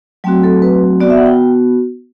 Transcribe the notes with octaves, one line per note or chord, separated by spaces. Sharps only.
F#3 A3 C4 F#4 G5
A4
B4
B3 F#4 D5
E5
F#5
G5